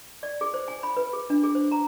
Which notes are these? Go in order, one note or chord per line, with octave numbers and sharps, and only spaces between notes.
D5
G#4
C5
G#5
B5
B4
G#4
D4
G#4
C5
A#5